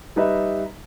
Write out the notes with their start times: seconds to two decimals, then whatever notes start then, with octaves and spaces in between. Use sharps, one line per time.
0.16 G3 D#4 B4 D#5 E5